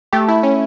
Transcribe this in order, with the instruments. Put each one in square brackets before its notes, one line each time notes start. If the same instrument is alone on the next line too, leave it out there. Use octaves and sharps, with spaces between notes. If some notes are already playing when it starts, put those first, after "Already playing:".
[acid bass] A3 [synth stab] G4
[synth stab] E4
C#4